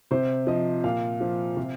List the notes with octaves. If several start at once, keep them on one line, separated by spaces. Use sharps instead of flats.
C3 C5
F3 D#5
A#2 F5
F3
C3